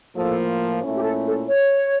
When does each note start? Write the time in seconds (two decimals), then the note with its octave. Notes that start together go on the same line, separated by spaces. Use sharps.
0.15 A2 F3 A#3 A4
0.81 A#2 A3 C#4 E4
0.96 G4
1.03 A4
1.26 A4
1.48 C#5